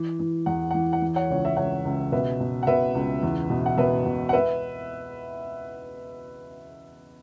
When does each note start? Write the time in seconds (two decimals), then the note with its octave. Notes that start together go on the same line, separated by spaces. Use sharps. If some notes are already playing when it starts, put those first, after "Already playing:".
Already playing: E3
0.19 E3
0.46 E2 F#5
0.71 E3 F#5
0.93 F#5
1.01 E3
1.16 C#5 F#5
1.30 C#2 C#5
1.45 E5
1.57 C#2 C#5 F#5
1.85 C#2
2.12 B2 B4 E5
2.40 B2
2.63 F#5
2.67 B2 B4 E5
2.95 C#2
3.22 E2
3.50 B2
3.66 F#5
3.78 B2 B4 E5
4.05 B2
4.29 F#5
4.33 B4 E5